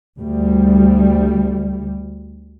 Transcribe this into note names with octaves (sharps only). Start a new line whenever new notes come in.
D2 G3